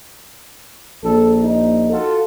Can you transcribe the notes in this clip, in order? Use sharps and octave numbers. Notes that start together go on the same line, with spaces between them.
A#1 A4
D#4
F4 F#4 A4